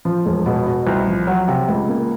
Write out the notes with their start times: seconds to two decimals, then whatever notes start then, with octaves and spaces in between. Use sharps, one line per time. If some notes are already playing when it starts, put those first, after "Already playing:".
0.05 F3
0.26 E1
0.46 B2
0.66 B2
0.87 C2
1.07 F3
1.27 F#3
1.48 C3
1.69 C#2
1.89 A#3